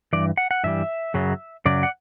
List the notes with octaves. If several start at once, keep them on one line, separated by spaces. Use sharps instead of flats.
G2 E3 D5
F#5
F#5
G2 E3 G3 E5
F#2 C#3 F#3
F#2 C#3 F#3 D5
F#5